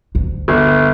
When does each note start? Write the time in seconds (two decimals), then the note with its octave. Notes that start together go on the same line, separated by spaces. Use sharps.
0.15 D2
0.48 G1